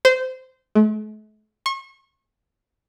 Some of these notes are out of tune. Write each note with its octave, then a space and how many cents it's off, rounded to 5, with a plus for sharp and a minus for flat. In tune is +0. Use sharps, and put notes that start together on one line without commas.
C5 -20
A3 -45
C#6 -35